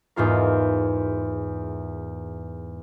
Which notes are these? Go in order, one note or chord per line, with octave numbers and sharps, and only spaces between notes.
E2 G#2 F4 A#4